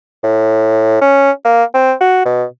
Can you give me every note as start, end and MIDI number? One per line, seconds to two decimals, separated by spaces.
0.24 1.00 45
1.01 1.31 61
1.45 1.64 58
1.74 1.93 60
2.01 2.21 66
2.25 2.44 47